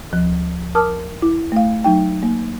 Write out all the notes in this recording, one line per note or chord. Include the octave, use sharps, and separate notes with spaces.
D2 F3
A#4 A5 D6 D#6 F6
E4
A3 F5
F#3 D#4 G5
A#3